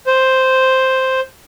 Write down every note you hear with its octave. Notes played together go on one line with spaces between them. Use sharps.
C5